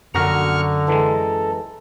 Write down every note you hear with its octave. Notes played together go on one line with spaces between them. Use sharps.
A#1 F#2 D3 F#4 A#4 A#5 C#6 F6
E3 G#3 A4